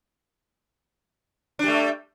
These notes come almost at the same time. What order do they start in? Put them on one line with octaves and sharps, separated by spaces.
D4 G3 A3